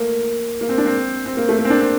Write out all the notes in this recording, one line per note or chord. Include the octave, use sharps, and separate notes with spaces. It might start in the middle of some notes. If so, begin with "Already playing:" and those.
Already playing: A3 A#3
A#3
C4
D4
C4
C4
A#3
A3
A#3
C4
D4
C4